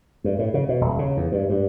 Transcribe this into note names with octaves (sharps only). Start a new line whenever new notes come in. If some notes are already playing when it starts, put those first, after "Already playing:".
G2
A2
C#3
B2
D#1
C#3
E2
G2
G2